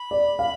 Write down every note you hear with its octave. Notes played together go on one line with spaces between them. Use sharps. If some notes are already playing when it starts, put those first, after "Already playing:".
Already playing: B5
D5
F5